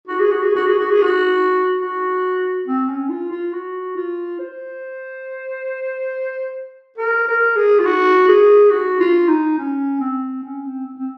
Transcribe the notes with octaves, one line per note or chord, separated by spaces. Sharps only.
F#4
G#4
F#4
G#4
F#4
G#4
F#4
G#4
F#4
F#4
C4
C#4
F4
F4
F#4
F4
C5
A#4
A#4
G#4
F4
F#4
G#4
F#4
F4
D#4
C#4
C4
C#4
C4
C4
C4